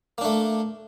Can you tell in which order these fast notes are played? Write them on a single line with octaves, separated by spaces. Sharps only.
A#3 D4 A3